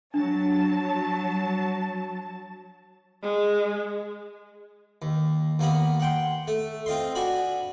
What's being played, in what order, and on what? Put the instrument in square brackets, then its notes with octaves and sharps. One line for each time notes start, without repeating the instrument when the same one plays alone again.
[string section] F#3 A5 [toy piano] D4
[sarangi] G#3
[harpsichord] D#2
D#2 A#3 B3 B5
F#5 G5 C6
A3
C4 F4 D#5 C6
D4 F#4 G#5 B5